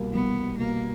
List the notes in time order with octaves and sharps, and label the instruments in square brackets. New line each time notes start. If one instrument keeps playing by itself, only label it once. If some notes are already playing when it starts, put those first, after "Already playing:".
Already playing: [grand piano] C2 B2 G3 A#3
[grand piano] C2 [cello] B3
[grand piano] G3
[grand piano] B2 [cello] A#3